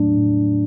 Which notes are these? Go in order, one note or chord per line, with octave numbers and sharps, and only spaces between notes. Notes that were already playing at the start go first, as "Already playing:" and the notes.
Already playing: A2 F#3 A3 D4
A2